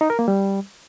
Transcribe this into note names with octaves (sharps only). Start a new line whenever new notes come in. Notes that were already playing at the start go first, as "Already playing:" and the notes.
D#4
A#4
A#3
G3